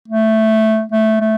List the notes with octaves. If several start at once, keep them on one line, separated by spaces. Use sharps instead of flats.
A3
A3
A3